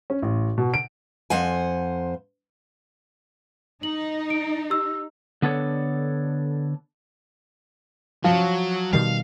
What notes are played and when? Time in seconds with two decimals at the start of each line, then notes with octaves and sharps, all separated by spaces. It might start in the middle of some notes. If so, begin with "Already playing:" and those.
0.10 C#4
0.22 A1
0.58 B2
0.74 D7
1.30 F2 C5 F#5 G#5
3.83 D#4 F#7
4.30 D7
4.70 G4 E6
5.42 D3 B3 D4 A4 C#5
8.24 F3 F#3
8.93 B2 D#3 G3 F5